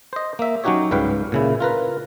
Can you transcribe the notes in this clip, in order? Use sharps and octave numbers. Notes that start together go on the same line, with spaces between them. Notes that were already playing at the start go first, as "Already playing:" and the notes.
C5 D#5
A#3 E5
F#3 C#4 D#4 F#4 G4 C#5
C#2 G#2 G3 B4 F5 G5
A#2 C#3 E4
F4 A#4 B4